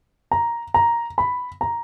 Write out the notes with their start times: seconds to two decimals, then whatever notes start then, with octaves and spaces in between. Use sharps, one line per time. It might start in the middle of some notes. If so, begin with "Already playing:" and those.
0.31 A#5
0.74 A#5
1.18 B5
1.61 A#5